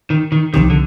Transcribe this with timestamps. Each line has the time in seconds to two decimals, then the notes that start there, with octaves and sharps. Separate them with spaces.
0.10 D#3
0.32 D#3
0.54 C2 C3 D#3 F3 C4 G4
0.70 D3